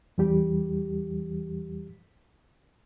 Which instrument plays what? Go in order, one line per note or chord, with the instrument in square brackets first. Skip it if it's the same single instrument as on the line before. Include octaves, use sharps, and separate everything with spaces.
[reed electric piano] E2 E3 G3 G4